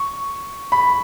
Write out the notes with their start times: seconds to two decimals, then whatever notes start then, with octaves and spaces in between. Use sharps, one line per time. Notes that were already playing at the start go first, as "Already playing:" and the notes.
Already playing: C#6
0.72 B5